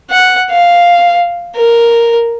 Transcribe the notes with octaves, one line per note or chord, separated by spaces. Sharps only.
F#5
F5
A#4